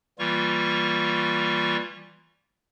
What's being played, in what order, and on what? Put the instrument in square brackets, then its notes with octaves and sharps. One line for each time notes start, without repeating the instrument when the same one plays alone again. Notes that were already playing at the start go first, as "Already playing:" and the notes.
[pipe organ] E3 G3 A#3 F4 C#6